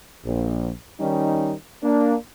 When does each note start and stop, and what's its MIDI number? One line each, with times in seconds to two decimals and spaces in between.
0.25 0.70 34
1.00 1.54 51
1.00 1.54 55
1.00 1.54 61
1.00 1.54 63
1.83 2.15 58
1.83 2.15 62